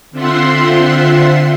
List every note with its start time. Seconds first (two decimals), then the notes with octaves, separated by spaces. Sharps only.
0.11 D3 C4 F4 E5 F#5 C6